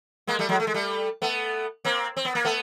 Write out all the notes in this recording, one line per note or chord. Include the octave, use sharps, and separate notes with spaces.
G#3 A#3
G3 A3
F#3 G#3
A3
G#3
G3 A3
A3 B3
A#3 C4
C4
B3
A#3
A3 B3